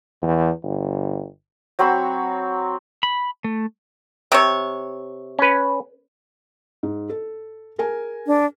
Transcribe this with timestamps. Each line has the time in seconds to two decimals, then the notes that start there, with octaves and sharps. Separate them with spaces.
0.22 E2
0.63 G1
1.79 F#3 C4 B5 C#6
3.03 B5
3.44 A3
4.32 C3 C#5
5.39 C#4 B4
6.83 G#2
7.09 A4
7.78 G#4 A#4 G#5
8.27 D4